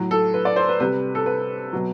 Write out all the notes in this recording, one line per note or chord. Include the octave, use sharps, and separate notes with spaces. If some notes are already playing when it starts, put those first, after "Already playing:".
Already playing: A2 F#3
A4
B4
D5
C5
B4
C3 G3 B4
A4
B4
B2 F#3